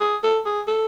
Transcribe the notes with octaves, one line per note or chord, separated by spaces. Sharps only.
G#4
A4
G#4
A4